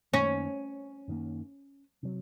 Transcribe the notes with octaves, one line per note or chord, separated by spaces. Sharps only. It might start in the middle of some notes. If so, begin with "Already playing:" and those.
F#2 D#3 A#3 C#4
F#2 D#3 A#3
C3 F#3